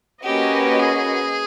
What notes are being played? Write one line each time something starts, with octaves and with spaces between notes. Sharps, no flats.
A#3 C#4 F#4 G4 B4 D#5
G#4